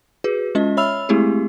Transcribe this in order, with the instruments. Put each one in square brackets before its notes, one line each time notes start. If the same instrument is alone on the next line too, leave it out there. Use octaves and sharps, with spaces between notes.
[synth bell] F#4 G#4 B4
G#3 C#4 F4 D#5
C#5 E5 B5 E6 F6 F7
G#3 A3 C4 E4 G4 G#4